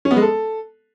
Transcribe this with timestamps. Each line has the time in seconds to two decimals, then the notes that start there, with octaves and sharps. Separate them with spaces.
0.05 C#4
0.11 B3
0.16 G#3
0.22 A4